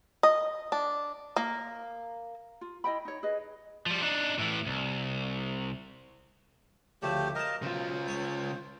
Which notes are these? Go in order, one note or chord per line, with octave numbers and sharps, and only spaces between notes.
D#5
D4
A#3
F4
E4 D#5 G5 B5
D#4 C#5
G#4 B4 D#5
F3 G3
D4 D#4
A2 E3
C2
D2 C#3 F3 A3 G4
A#4 D#5 F5 A5
B1 C#3 F4 C5
C#2 C#5